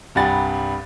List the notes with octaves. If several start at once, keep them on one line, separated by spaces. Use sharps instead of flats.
C2 G2 G4 F#5 G#5 A6